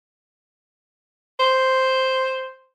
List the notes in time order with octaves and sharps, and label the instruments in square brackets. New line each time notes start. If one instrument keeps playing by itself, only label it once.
[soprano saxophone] C5